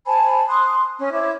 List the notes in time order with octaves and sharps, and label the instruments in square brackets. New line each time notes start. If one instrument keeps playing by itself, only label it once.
[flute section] C5 G#5 A5 B5
C6 D#6 F#6
C#4
E4 C5 C#5 D6